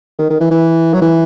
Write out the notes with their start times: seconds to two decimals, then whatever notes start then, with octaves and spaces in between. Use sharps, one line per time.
0.19 D#3
0.30 D#3
0.41 E3
0.51 E3
0.94 F#3
1.02 E3